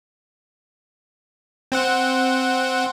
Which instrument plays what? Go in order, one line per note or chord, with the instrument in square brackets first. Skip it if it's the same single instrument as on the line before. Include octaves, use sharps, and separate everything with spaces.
[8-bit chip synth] C4 C5 F#5